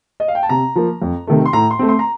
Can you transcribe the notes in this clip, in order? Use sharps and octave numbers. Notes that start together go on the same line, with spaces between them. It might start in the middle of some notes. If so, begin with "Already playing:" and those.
D#5
F5
G5
A5
C3 A#5
F3 A#3
F2
C3 D#3 A3
C6
A2 A#5
C6
A3 C4
C6
A#5